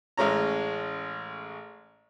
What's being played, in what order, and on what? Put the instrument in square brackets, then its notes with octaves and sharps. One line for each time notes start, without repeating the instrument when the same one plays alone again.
[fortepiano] A1 G#3 C#4 A#5